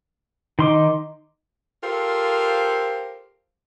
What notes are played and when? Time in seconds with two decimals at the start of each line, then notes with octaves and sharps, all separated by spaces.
0.59 D#3 D#4 C6 D6
1.84 F4 G4 A4 A#4 C5 F5